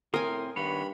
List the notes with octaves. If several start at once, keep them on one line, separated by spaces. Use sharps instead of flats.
A2 C4 A#4 G#5 C6 D#6
G2 D#3 B3 C#5 B5